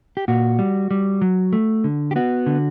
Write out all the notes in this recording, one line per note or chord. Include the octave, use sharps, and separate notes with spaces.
G4
A#2 F#4
G3
G3
F#3
A3
D3
G4
B3 F#4
D3